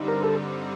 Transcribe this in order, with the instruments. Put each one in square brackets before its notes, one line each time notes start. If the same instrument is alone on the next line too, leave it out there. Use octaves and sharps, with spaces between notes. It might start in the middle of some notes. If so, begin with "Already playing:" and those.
Already playing: [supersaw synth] G2 D3 G3 C4 D#4
[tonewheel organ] A#4
A4